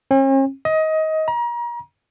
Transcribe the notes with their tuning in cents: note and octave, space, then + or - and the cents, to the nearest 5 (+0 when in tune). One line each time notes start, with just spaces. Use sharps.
C#4 -45
D#5 +20
A#5 +35